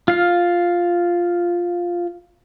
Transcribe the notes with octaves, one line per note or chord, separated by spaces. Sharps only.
F4 F5